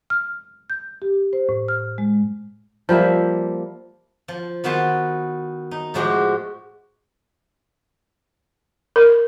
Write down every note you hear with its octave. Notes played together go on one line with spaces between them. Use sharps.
F6
G6
G4
C5
A2
F6
G#3
F3 G3 A#3 E5
F3
D#3 B3 F#4 A5 C6
D#4
A2 F3 G#3 F#4 G4
A#4